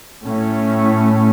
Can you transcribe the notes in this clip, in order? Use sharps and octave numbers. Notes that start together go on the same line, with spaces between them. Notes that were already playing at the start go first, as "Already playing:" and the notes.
A2 A3 C#4